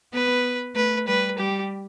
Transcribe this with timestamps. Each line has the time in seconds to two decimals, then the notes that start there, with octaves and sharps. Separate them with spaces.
0.13 B3 B4
0.75 A3 B4
1.07 G3 B4
1.38 G3 G4